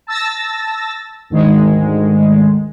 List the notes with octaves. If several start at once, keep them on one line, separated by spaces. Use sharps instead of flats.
A5 E6 A6 A#6
D2 G#2 D#3 G#3